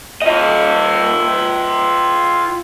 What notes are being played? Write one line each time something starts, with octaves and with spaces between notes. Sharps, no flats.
F4 D#5